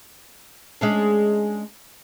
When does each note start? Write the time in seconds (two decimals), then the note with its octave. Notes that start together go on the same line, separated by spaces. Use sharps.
0.81 G#3 C#4 D4